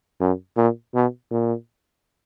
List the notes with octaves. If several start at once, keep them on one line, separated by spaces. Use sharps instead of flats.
F#2
A#2
B2
A#2